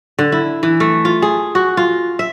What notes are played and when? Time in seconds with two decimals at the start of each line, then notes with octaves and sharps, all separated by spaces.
0.19 D3
0.32 E4
0.63 E3
0.80 A3
1.05 F4
1.22 G#4
1.55 F#4
1.77 F4
2.19 E5